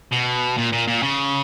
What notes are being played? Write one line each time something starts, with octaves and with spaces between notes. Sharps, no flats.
B2
A#2
A#2
A#2
C#3